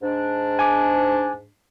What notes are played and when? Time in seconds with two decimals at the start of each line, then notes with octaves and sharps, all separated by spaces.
0.02 G#2 D4
0.59 G#5 D6